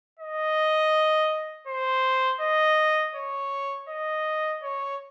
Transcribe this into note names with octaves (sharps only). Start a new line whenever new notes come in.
D#5
C5
D#5
C#5
D#5
C#5